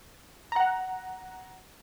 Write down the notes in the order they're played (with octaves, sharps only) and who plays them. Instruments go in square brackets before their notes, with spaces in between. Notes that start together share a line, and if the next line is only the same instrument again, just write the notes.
[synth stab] F#5 A#5